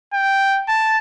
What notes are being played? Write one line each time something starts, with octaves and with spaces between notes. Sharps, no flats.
G5
A5